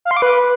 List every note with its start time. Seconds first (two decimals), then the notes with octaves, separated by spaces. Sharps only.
0.05 F5
0.11 C6
0.17 D6
0.22 B4